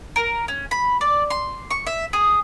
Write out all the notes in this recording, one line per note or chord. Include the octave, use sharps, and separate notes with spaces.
A#4
C#4
B5
D5
C6
C#6
E5
G#4